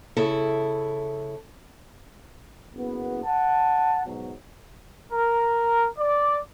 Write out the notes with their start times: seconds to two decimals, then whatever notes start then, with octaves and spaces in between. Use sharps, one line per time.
0.17 C#3 E4 A4
2.74 F#1 B3
3.24 F#5 A5
4.06 G#2 B2 F#3
5.13 A#4
5.99 D5